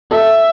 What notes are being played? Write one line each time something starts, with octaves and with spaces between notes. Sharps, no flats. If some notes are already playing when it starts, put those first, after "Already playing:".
A4 E5